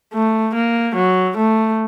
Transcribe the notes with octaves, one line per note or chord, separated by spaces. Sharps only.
A3
A#3
F#3
A3